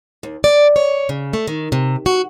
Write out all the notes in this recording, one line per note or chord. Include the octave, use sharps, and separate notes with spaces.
D#2
D5
C#5
C#3
A3
D#3
C3
F#4